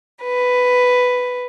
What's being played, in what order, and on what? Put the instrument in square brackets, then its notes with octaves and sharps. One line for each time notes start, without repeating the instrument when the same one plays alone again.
[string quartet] B4